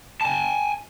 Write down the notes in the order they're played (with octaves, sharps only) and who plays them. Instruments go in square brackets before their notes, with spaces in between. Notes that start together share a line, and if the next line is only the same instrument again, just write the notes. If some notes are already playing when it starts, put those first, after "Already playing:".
[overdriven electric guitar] G#5 A5